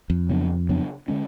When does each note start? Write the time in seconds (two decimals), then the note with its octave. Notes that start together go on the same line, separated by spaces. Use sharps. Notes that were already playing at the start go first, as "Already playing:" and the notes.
0.10 F2
0.30 C#3 F#3 B3 D4
0.69 C#3 F#3 B3 D4
1.08 D3 G#3 C#4